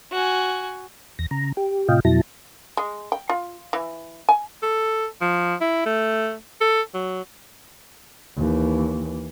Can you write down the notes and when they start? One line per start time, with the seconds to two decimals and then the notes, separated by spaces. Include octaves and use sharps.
0.12 F#4 G#5
1.19 E2 A#6
1.31 C#3 A#5
1.57 G4
1.89 A2 C3 F4 D#5 F5 G5
2.05 F2 B2 F#3 E4 A5 A#6
2.77 G#3
3.12 G5
3.29 F4
3.73 E3
4.29 G#5
4.63 A4
5.21 F3
5.61 E4
5.86 A3
6.61 A4
6.94 F#3
8.37 D#2 E3